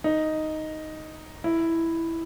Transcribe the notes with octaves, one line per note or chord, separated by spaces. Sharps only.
D#4
E4